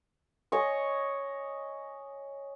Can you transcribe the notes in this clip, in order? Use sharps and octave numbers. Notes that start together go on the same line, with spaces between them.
C#5 D#5 G#5 C#6